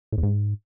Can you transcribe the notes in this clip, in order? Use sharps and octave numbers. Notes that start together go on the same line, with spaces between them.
A2
E2
G#2